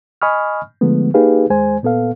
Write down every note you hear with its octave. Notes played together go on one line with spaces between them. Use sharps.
D#5 G#5 B5 C#6 D#6 F6
D3 F3 G#3 A3 B3
A#3 D#4 G4 G#4 B4 F5
D#2 G#3 C5 G#5
A#2 B3 A4 F5